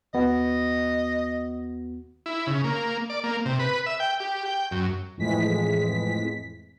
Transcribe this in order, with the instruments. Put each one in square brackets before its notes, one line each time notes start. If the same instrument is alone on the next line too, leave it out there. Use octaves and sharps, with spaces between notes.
[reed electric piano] D#2 B3 F#4 [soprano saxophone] D#5
[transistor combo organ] E4
C#3
A#3
D5
A#3
C3
B4
E5
G5
G4
G5
F#2
[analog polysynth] F2 A2 E3 G#3 B6